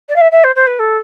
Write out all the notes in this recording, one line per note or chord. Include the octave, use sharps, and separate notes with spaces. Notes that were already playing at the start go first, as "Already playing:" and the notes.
D5
F5
E5
E5
C5
C5
B4
A4